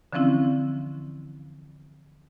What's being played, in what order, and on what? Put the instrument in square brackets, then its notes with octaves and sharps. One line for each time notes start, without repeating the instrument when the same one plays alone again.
[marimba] D3 E3 F3 C4 C#4 E4